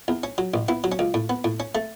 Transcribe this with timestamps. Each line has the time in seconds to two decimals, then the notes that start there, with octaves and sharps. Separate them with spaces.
0.08 E2
0.23 C#4
0.38 F#3
0.54 A1
0.68 B3 E4
0.84 F#3
0.92 C#4
0.99 C#2
1.14 A2
1.30 B3
1.44 A2
1.60 C#4
1.75 A3